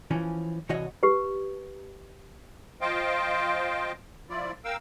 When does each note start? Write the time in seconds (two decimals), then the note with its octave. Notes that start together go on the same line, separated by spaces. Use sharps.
0.11 E3 F3 C#4
0.69 C2 E3 F#4 C#5 D#5 F#5
1.03 G4 B4
2.81 F3 F4 C5 D#5 F5 G5
4.30 F3 E4 F4 D5
4.64 A#4 F5 G5 E6